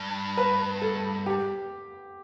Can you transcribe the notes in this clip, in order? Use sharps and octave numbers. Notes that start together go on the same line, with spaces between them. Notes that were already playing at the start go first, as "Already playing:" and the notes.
Already playing: G2
B4
A4
G4